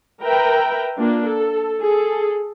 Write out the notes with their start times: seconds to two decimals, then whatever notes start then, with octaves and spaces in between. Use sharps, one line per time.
0.23 A#4 B4 E5 G5 A#5
0.97 A#3 D4 F4
1.28 A4
1.81 G#4 A4